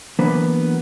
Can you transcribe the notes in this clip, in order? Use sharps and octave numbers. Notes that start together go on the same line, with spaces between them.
E3 F#3 A#3 B3 D4 B4